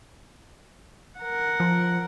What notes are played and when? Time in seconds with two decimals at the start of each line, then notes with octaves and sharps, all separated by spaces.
1.19 A#4 F#5
1.60 F3